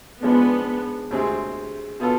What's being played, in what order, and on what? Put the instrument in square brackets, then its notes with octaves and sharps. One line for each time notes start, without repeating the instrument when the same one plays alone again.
[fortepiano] G#2 F3 G#3 D4 [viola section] B3
[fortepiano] D2 C3 G#3 C4 G#4
B2 B3 F4 A4